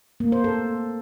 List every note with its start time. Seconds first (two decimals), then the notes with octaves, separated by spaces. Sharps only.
0.20 A#3
0.32 C5
0.44 A4